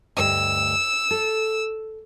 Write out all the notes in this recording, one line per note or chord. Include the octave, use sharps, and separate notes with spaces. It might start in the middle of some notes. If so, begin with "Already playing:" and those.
D2 G2 D#5 E6
A4